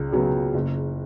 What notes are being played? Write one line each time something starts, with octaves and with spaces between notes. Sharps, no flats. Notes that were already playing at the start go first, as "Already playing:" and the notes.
Already playing: C#2 C#3
C#3 F#3 B3
F#1